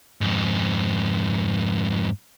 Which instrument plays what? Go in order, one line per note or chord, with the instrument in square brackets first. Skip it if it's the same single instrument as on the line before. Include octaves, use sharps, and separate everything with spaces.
[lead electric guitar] F2 G#2